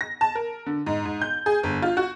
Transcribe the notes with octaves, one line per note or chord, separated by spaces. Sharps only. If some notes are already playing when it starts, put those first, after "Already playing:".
A#6
A5
A#4
D3
G#2
G#2
G6
G#4
G1
F4
F#4